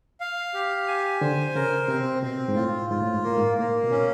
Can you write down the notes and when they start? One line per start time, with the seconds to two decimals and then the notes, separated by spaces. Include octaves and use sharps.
0.20 F5
0.54 G4
0.88 G#5
1.21 D3 C5
1.55 C#3 A#4
1.88 C3 C4
2.23 B2 C4
2.48 G#2
2.56 A2 F4
2.90 G#2 F4
3.02 A2
3.14 G#2
3.23 A2 A#3
3.37 G#2
3.58 A2 A#3
3.84 B2
3.91 A#2 C#4